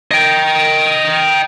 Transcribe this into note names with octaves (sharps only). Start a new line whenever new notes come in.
D#5 G5